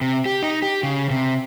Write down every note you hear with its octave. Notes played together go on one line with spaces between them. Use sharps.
C3
G4
D#4
G4
C#3
C3